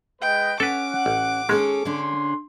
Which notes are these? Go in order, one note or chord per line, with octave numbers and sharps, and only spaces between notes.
G#3 B4 D#5 G5
C#4 A4 B4 F#5 D6
A1
D#3 G#3 C#4 G#4 A4
D3 C#4 D4 C6